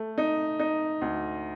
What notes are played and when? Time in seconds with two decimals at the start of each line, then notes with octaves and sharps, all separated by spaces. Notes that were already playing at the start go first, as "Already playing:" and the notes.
Already playing: A3
0.18 D#4
0.59 D#4
1.01 D2